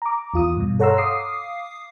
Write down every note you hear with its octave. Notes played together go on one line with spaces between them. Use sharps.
A#5 D6
E2 F4 D#6
G2 B2
A4 C#5 F#5 A#5 C6 E6
F5 D6 D#6 C7